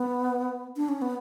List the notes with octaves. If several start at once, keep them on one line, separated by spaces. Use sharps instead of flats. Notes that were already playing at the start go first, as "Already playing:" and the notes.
Already playing: B3
D4
C#4
B3